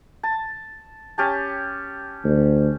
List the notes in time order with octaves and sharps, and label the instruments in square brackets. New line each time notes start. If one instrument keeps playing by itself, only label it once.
[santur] A5
C#4 G4 A5
[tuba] D2